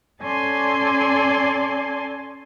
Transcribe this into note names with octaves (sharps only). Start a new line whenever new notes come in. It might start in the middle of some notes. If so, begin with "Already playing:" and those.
C#4 A4 D5 G#5 A5 C6